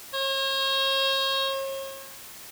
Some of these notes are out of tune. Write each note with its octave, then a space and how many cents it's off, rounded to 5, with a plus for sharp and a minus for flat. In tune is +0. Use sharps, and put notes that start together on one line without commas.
C#5 -40